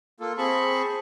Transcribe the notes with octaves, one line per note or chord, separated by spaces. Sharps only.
A#3 F4 A4
C4 G#4 A5 B5 C#6